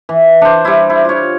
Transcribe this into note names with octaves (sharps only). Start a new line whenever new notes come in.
E3
D4 C5
G3 E4
E4
F4 C#5